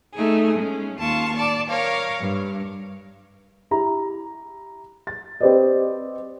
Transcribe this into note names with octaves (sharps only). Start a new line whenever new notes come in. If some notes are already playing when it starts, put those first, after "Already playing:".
A3 D#4 G#4
G#3 C#4
D#2 F4 A5 C#6
D5 A5
A#4 C#5 F5
G2
E4 G4 A#5
A6
C4 G4 B4 C5 D5 D#5